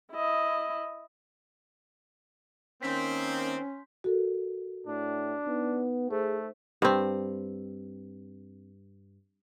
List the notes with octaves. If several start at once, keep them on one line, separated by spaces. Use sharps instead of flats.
E4 D#5
D#3 A#3 C4 C#4 C6 G6 B6
F#4 A4 A#4
A2 D4
B3 D#4
A3 G#4 C5
G2 C4